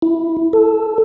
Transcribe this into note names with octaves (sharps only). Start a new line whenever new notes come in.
E4
A4